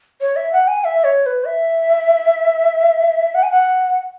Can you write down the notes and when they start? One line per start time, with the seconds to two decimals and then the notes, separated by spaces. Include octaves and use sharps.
0.21 C#5
0.36 E5
0.53 F#5
0.68 G#5
0.84 E5
1.04 C#5
1.26 B4
1.46 E5
3.35 F#5
3.43 G#5
3.51 F#5